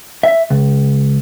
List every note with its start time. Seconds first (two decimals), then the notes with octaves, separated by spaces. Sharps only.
0.23 E5
0.50 C#2